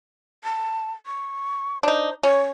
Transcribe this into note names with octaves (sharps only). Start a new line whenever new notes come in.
A5
C#6
D4 D#4 C5
C#4 C#5